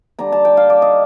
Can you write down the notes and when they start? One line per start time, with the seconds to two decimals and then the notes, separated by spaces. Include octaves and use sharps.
0.19 D3 G3 D4 A#5
0.32 A5
0.45 G5
0.57 F5
0.70 D5
0.82 D#5